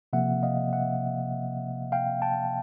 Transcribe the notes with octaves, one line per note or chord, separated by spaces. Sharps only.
C3 F3 A#3 E5 F#5
D#5 F5
E5 F#5
F5 G5
G5 A5